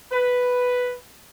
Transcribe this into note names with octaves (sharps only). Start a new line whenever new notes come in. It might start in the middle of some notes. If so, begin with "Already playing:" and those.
B4